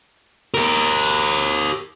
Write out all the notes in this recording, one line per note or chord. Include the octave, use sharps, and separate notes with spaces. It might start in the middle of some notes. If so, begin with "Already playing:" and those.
G4 A#4